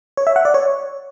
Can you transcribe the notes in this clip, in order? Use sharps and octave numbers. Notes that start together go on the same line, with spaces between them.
C#5
E5
F#5
D5
C#5